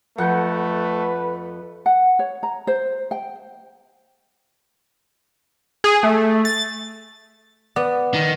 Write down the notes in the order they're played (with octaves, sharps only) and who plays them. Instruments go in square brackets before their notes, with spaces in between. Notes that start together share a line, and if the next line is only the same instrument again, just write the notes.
[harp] F2 C#6 G6 [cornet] A3 [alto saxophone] B4 [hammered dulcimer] F#5
[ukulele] F#5
C#5
A#5
C5
G5
[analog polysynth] G#4
A3
A6
[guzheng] B3 [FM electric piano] D5
[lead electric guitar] D#3